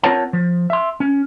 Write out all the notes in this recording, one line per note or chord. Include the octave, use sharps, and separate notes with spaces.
C4 F4 A#4 C#5 F#5 A5
F3
E5 C6
C#4